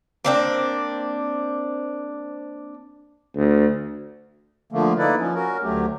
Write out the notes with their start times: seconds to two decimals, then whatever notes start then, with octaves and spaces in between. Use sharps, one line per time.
0.24 A#3 C4 D4
3.35 D2
4.72 D3 F3 A3 A#3
4.98 A#3 D#4 E4 A4 B4 D5
5.18 F3 C#4
5.35 C#4 F#4 A#4
5.63 D2 F#3 A3 G4